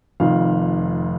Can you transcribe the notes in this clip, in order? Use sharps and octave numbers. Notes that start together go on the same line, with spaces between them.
F1 F2 D#3 F5